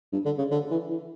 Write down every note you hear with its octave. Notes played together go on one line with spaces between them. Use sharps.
G2
D3
C#3
D3
E3
E3